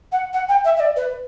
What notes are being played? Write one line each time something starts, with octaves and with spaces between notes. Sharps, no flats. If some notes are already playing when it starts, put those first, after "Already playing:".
F#5
F#5
G5
E5
E5
D5
B4